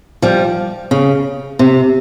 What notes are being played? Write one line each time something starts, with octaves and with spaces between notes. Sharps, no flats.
F3 G3
C#3
C3